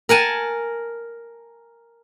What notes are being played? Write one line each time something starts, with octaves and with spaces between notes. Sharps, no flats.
A#4 F#5 G#5 A5